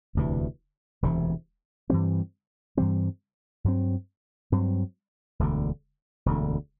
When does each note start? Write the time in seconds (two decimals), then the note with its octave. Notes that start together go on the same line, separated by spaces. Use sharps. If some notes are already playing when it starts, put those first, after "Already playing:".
0.15 E1 D2 C3 E3
1.02 E1 D2 C3 E3
1.90 G2 E3 G3 C4
2.77 G2 E3 G3 C4
3.64 G2 F#3 C4
4.52 G2 F#3 C4
5.39 E1 D2 D3
6.26 E1 D2 D3